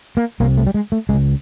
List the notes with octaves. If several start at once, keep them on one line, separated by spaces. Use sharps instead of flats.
A#3
C2 C3 A#3
A3
G3
G#3
A3
C#2 G#3
C#3